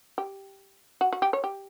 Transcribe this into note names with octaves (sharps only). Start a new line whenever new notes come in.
G4
F#4
F#4
G4
C#5
G4